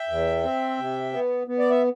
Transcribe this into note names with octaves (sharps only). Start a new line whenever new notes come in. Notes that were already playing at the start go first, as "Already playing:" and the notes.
Already playing: E5 G5
E2
C4
C3
B3
B3
D5
E5